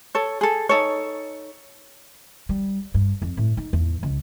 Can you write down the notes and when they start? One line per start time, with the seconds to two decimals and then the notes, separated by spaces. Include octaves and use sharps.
0.15 A4 C#5
0.41 G#4 A4
0.69 D#4 A4 C#5
2.49 G3
2.94 G2
3.22 F2
3.37 A2
3.57 D#4
3.73 E2
4.03 C#2